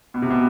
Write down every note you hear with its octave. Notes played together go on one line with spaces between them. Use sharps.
B2
C3
B2